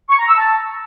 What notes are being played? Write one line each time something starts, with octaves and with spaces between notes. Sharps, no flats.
C#6
A#5
E6
A5